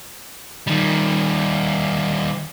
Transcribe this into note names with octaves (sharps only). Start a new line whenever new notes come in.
D#3 G3